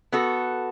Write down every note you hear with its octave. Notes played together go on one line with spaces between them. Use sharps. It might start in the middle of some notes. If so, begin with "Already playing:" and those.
B3 F#4 A4